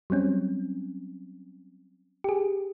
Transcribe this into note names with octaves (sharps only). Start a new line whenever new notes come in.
F#3 G3 C4 C#4
G4 G#4